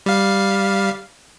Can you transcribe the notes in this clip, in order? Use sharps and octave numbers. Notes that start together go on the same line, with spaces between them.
G3 F5